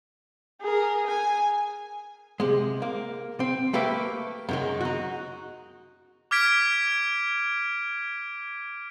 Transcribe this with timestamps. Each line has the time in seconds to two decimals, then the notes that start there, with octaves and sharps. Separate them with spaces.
0.62 G#4 A#4
1.07 G#5
2.40 C3 G#3
2.82 A#3
3.40 C4
3.73 A3 A#3 G4 B4 E5
4.49 F#2 D#3 G#3
4.81 D#4 F#4
6.31 D6 F6 G#6 B6 D7